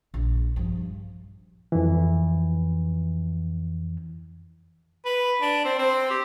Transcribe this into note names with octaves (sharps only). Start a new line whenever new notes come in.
A#1
G2 F3
F2 E3
B4
D4
C4
C4
G4